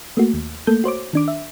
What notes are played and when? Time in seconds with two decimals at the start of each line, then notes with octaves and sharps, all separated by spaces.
0.17 A3 A#3 F#4
0.34 D#2
0.67 A3 A#3 A4 G6
0.84 F#4 C5 C#5 D6
1.13 D#3 D4 D6
1.28 E5